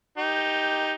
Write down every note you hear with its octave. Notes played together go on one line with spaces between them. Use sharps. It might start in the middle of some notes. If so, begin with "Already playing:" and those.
D#4 G4